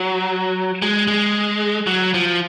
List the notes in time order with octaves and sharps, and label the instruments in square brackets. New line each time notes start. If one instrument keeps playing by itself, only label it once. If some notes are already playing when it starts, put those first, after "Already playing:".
Already playing: [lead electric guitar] F#3
G#3
G#3
F#3
F3